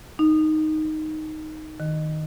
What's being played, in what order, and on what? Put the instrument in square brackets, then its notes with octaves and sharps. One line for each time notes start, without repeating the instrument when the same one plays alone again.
[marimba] D#4
D#3